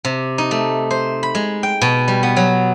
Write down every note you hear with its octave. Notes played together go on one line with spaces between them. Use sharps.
C3
D#4
A3
C5
B5
G#3
G5
B2
G3
B3
F#3